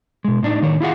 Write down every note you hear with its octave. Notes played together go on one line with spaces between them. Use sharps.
B2 G#3
A2 D4 D#4
A2 D#3 C#5
E4 F4 G#4 F#5